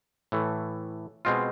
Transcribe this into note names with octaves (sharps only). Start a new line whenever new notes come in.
A2 E3 A3
B2 G#3 C4 F4